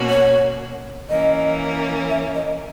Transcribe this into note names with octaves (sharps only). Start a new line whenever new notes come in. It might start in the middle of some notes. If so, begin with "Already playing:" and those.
Already playing: B2 A#3 C#4 F#4
C#5
E3 A#3 C#4 D#5
E5
D#5